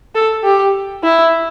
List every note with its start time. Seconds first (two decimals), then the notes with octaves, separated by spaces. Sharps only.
0.15 A4
0.44 G4
1.04 E4